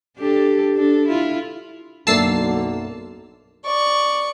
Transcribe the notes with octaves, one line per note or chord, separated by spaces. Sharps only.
D4 G4 A4
D4 A4
E4 F4
B1 F#2 D3 A#3 E5 A5 E6 C7
D5 C#6